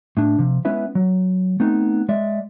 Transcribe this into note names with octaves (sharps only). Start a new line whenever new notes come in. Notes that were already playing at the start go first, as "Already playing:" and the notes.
A2 D4
C3 F3
G#3 B3 C#4 E4 B4 E5
F#3
A3 B3 C4 D#4
G#3 D5 E5